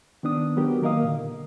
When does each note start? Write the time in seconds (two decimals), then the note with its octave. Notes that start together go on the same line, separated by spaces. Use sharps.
0.23 D#3 B3 D4 D#6
0.56 F#3 B3 F#4 G4 A#4
0.82 D#3 A#3 A#4 D#5 F5 D#6
1.03 A#2 D3